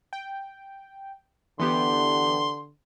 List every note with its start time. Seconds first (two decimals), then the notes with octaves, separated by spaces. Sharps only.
0.13 G5
1.60 D3 E3 B3 G4 C6